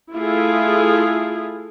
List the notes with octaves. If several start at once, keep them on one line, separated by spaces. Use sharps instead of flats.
A3 E4 F4 G#4